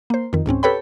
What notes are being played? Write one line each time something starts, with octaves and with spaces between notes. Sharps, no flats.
A#3 C5
F2 D#3
C#2 G#2 C4 C#4
G4 A4 B4 C#5 G5 B5